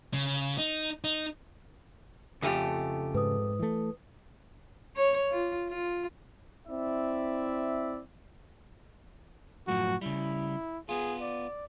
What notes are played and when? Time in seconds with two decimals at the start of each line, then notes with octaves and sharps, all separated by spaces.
0.14 C#3
0.58 D#4
1.04 D#4
2.42 F2 C#3 A3 F4 G4 G#5
3.14 G#2 B4 D#6
3.59 E3 A3
4.96 C#5
5.31 F4
5.69 F4
6.68 C4 E4 D5 E5
9.67 F#2 A2 F3 F#4
10.01 C#3 G3 E4
10.89 B3 F4 G#4
11.21 D5